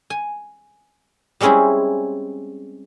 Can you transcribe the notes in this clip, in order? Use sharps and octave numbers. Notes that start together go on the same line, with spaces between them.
G#5
G3 G#3 C4 C#4 E4 G#4